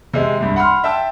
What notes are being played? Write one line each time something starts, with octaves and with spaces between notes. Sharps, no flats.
C3 G#3
C2 G2
F#5 B5 C6 F6
E5 G5 A5 E6